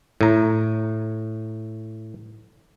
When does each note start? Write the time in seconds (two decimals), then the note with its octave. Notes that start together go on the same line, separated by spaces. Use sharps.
0.21 A2 A#5